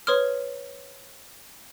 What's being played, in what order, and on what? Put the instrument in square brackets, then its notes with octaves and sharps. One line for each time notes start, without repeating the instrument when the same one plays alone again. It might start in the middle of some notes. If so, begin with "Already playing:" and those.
[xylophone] B4 C#5 C6 D#6 F6